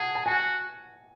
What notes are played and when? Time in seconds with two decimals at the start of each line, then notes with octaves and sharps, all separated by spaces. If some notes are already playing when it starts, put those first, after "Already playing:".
Already playing: G#4 F#5 A5
0.15 A5
0.26 F#4 G#5